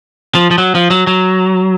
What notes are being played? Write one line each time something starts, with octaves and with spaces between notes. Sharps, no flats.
F3
F3
F#3
F3
F#3
F#3